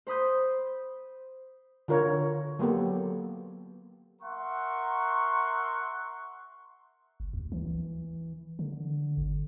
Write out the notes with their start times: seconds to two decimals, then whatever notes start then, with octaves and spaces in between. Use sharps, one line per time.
0.07 C5 B5 D#6 G6
1.88 D3 F4 A#4 C#5
2.59 F#3 A#3 B3 G4 A4
4.22 A#4 E5 F#5 C6 C#6
7.20 F#1
7.33 D2
7.52 E3
8.59 D3
9.17 G1